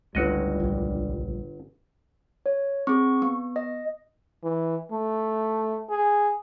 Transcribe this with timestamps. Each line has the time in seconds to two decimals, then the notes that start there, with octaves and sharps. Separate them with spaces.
0.15 G1 C#2 A2 G3 F#4 D#5
0.60 A#1 G2
2.46 C#5
2.87 C4 G#4 C#6
3.22 B3
3.56 D#5
4.43 E3
4.92 A3
5.90 G#4